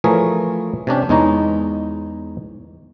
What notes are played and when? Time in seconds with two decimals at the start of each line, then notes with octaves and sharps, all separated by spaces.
0.04 E3 F3 A3 G#4 A#4 C#5
0.87 C3 C#4 D4 G4
1.09 E2 G#3 D#4 C#5 A#5